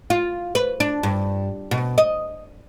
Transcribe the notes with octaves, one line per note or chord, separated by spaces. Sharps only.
F4
B4
D4
G2
B2
D#5